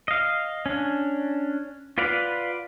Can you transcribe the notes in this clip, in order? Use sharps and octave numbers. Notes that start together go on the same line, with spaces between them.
D#5 F5
C#4 D4
F4 B4 D5 F5 F#5